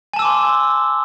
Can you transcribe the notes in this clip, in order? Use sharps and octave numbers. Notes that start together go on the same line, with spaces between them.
G#5 A5 C6 D6 E6